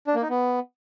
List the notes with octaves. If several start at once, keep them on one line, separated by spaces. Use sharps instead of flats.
D4
A#3
D#4
B3